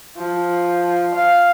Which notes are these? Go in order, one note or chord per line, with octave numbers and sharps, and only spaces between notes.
F3
F5